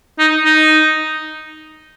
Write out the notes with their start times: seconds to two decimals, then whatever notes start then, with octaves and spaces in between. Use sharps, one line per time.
0.19 D#4
0.45 D#4